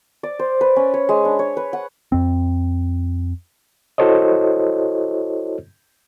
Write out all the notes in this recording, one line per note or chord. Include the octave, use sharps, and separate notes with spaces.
D5
C5
B4
C#4
C#5
G#3
D4
C#5
B4
F#5
F2 C4
E4 F#4 A4 C5 C#5 D#5